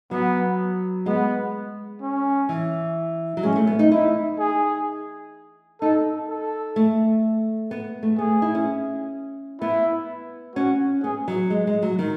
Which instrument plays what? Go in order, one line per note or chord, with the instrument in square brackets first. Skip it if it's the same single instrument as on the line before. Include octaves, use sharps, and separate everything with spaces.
[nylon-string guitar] F#3 [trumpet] B3
[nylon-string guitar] G#3 [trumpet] B3
[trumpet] C#4
[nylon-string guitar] E3
F#3
[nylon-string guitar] G#3 [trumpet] C#4
[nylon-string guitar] A3
B3
D#4
[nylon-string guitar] D#4 [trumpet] E4
[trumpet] G#4
[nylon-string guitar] D#4 [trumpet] A4
[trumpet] A4
[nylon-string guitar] A3
B3
A3
[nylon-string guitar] B3 [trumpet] G#4
[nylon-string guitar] E4
C#4
[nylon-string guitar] B3 [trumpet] E4
[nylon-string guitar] C#4 [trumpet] F#4
[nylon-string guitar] B3 [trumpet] G#4
[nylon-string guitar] F#3
G#3
G#3
F#3
D#3